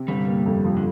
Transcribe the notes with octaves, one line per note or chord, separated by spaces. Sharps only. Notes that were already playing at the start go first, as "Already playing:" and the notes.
Already playing: C3
G1 G3
A#3
F2
F3
D3